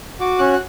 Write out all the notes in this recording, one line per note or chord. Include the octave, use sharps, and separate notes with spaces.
F#4 D6
C#4 F#6
F#6